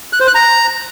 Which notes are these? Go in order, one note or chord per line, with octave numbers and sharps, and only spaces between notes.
F#6
C5
F#6
A#5